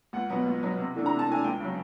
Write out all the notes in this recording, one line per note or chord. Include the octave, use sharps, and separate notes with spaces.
C#2 F#5
B2 F#3 B3
C#2
B2 F#3 B3
C3
E3 A3 D4
A#5
C3
A5
E3 A3 D4 G#5
C#2 G5
C#3 F#3